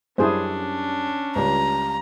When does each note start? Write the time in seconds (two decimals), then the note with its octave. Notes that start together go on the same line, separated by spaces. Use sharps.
0.18 F#2 G3 C#4 D4 E4 G#4 C5
1.36 C#2 G3 A#5